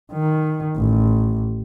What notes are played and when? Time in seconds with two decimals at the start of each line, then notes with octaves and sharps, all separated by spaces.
0.12 D#3
0.76 A1